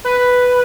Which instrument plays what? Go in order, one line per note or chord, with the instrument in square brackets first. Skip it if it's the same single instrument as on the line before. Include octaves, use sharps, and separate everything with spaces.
[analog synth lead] B4